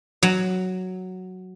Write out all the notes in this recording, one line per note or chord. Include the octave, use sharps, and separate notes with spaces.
F#3